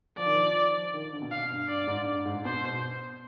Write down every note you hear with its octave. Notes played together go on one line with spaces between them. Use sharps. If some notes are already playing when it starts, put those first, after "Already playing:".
F3 D5
D#3
F3
D#3
D3
B2
F5
G2
G2 D5
G#2
G2
G#2
B2 C5